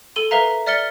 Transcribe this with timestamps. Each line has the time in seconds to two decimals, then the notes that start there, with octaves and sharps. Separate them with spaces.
0.16 A4 D#7 G7
0.31 A#4 B4 E5 F5 A#5
0.66 D5 E5 F6 A6 C#7 G7